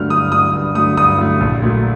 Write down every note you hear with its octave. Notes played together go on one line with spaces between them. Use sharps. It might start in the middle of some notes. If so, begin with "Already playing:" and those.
Already playing: G2 D3 F#3 A3 F6
G2 D#6
D3 F#3 A3 D#6
G2
D3 F#3 A3 D#6
G2 D#6
D3 F#3 A3
A#1
A#2 F#3 A3